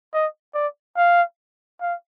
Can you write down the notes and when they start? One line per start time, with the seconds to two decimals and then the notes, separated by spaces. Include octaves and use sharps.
0.14 D#5
0.55 D5
0.97 F5
1.81 F5